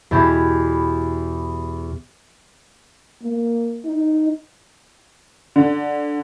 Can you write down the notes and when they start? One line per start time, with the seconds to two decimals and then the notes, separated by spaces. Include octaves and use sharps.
0.11 E2 B2 G4 G#6 B6
3.23 A#3
3.85 D#4
5.56 D3